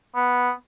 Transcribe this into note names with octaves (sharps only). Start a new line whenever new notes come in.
B3